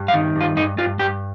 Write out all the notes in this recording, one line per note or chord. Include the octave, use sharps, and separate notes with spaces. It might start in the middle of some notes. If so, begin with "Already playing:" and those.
Already playing: G2
F5
D#3
G2 F4
G2 D#4
G2 F4
G2 G4